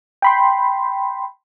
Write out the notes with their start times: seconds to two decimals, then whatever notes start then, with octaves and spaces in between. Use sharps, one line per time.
0.22 G5 B5 C6